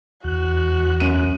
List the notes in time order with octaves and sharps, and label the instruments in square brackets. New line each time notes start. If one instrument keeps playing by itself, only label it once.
[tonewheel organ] E2 F#6 [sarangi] F#4
[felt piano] F#2 D#7